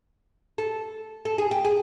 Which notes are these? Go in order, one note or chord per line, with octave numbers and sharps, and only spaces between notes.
A4
A4
G#4
G4
G#4